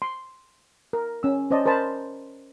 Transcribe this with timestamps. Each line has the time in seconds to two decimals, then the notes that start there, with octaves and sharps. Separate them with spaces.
0.02 C6
0.93 A#4
1.23 C#4 E6
1.50 C#4 C5 D5 D#5 A5
1.66 A#4 C5 D#5 A5 B5